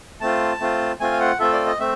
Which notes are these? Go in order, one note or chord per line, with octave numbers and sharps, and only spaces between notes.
A3 C4 F4 A5
A3 C4 F4
A3 C4 F4 G#5
F5
F#5
A3 C4 F4 A4 E5
D5
D#5
A3 C4 E5